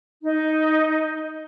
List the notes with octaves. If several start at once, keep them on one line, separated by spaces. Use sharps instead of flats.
D#4